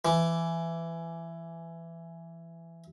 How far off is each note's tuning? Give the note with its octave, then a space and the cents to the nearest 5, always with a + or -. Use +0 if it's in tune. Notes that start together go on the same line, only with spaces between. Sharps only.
E3 +20